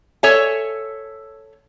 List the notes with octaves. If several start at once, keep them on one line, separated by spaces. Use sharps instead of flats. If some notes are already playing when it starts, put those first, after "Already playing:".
A4 C#5 E5 G#5